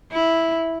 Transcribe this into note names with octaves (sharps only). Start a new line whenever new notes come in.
E4